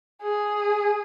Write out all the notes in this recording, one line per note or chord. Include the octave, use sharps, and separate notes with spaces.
G#4